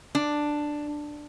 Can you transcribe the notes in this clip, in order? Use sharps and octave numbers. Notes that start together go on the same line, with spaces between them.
D4